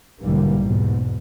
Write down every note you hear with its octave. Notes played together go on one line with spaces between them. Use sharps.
B1 G#2 D3 E3 G3 A#3
E2 G#2 B2